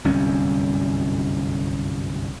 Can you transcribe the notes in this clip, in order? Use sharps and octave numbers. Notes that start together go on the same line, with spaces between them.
G1 C2 F#2 C#4